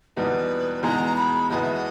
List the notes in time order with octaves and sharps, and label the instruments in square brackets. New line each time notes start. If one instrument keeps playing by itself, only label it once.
[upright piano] E2 B2 G3 B3 D#4 [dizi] B4
[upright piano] E2 B2 G#3 D#4 G#4 [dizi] A#5
[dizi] B5
[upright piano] E2 B2 G#3 B3 [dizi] D#5
[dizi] E5
D#5